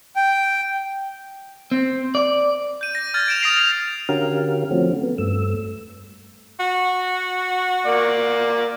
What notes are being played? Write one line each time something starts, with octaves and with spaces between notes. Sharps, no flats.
G5
C4
D5
G6 D#7
A#6
F6 G#6 A6
D7 E7 F7
D#6 A6 A#6 C7 D7 F7
F7
D3 C#4 F#4 G4 A#4 F5
F3 A3 C4 C#4 F#4
B3
G2 A3 E6
F#4
A#3 D5